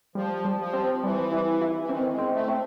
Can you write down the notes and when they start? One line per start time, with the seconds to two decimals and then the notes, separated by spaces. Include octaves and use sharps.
0.15 F3 G3
0.45 G3
0.60 F3
0.73 C4
1.03 E3 G3
1.32 E4
1.62 E4
1.81 E3
1.89 D#3 C4
2.12 G#3
2.18 C4
2.33 A3
2.48 C4